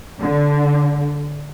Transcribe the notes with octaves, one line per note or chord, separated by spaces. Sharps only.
D3